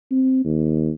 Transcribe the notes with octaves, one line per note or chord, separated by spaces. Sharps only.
C4
D#2